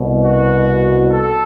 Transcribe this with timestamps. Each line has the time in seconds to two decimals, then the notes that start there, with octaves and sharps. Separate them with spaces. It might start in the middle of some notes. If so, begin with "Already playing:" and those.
Already playing: C2 B2
0.25 F#4
1.11 A4